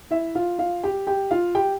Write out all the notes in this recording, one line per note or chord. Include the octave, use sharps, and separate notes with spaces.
E4 E5
F4 F5
F4 F5
G4 G5
G4 G5
F4 F5
G4 G5